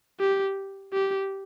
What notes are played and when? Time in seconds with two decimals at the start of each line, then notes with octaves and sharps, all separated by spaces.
0.20 G4
0.93 G4